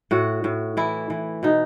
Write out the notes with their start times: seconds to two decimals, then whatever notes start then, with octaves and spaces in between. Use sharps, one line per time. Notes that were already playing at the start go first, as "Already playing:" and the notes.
0.11 A2 F#4
0.44 A2
0.77 E3 E4
1.10 E3
1.43 B2 D#4